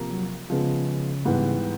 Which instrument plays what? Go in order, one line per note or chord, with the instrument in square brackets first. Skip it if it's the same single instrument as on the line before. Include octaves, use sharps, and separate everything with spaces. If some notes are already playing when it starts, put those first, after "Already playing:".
Already playing: [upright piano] C3 F3 A#3
[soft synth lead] F#3
[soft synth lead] C#3 [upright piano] F3 G#3 B3
[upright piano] G#2 E3 G3 B3